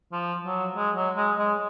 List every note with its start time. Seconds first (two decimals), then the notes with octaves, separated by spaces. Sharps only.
0.12 F3
0.44 F#3
0.75 G#3
0.95 F#3
1.16 G#3
1.38 G#3